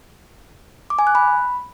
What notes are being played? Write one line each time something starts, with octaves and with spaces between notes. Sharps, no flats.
D6
G#5
F#6
B5